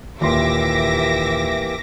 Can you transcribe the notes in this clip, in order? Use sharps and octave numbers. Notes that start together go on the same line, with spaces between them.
D#1 E3 A#3 G4 E5 C6 D6 A#6